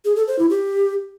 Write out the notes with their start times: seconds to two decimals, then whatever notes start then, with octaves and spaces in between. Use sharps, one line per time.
0.05 G#4
0.16 A4
0.28 C5
0.39 E4
0.50 G4